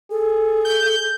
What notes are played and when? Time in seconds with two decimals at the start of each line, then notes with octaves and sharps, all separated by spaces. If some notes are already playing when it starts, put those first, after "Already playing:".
0.11 G#4 A4
0.65 G6